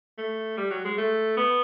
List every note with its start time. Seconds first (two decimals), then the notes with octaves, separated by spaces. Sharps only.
0.18 A3
0.57 G3
0.70 F#3
0.85 G#3
0.98 A3
1.37 B3